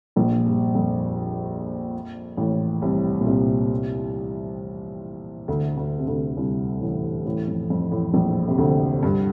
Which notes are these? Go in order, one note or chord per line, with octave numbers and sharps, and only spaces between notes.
A#1 A#2
G2
F2
A1 A2
C2 C3
A#2
C2 C3
D2 D3
D2 D3
C3
D2 D3
C2 C3
A1 A2
A1 A2
F2
F2
A1 A2
A#1 A#2
C3
D2 D3
G2